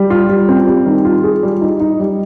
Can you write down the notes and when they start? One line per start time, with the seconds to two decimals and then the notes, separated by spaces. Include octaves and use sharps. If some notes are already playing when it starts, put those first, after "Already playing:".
Already playing: G3
0.10 F4
0.29 G3
0.49 C4
0.67 G3
0.86 D#3
1.05 F4
1.24 G#4
1.43 G3
1.61 D#4
1.80 D#4
2.00 G3